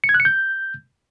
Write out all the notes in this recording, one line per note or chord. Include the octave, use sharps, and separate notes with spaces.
C#7
G#6
F#6
C#7
G6